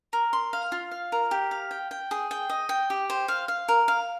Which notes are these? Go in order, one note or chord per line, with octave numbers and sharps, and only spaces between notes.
A#4
C6
F5
F4
F5
A#4
G4
F5
G5
G5
G#4
G5
D#5
G5
G4
C5
F5
F5
A#4
F5